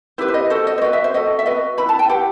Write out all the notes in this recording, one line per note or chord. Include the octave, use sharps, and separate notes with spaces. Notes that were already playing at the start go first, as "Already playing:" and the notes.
E4 G4 B4 C5
C5
D#5
F#4 A4 C5
D#5
C5
F#4 B4 D#5
E5
C5
F#4 A4 D#5
E5
F#4 B4 D#5
E4 B4 B5
A5
G5
E4 G4 B4 F#5